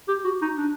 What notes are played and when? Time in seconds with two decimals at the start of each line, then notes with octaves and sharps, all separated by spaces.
0.08 G4
0.24 F#4
0.42 D#4
0.57 D4